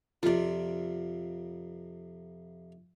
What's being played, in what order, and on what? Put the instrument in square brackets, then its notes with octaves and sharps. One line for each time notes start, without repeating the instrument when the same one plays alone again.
[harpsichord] F2 C3 [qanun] F4 D5